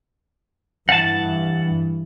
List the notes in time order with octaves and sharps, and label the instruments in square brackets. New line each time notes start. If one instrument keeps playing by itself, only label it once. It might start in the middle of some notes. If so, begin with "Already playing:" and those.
[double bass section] G2 E3 [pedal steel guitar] F#5 A5